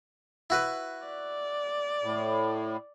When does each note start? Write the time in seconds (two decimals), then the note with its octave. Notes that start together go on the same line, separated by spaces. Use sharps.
0.50 E4 F#4 B4
1.06 D5
2.03 A2